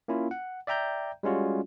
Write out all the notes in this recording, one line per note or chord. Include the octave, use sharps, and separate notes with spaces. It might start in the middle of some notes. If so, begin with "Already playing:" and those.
A#3 C#4 E4 F4
F#5
D5 E5 G5 A#5 G6
G3 G#3 C#4 F4 F#4